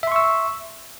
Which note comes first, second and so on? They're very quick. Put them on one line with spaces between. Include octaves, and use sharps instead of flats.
E5 C6 C#6 E6